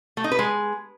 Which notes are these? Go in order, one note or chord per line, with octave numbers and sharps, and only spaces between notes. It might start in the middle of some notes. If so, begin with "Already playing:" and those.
A3
D#4
B4
G#3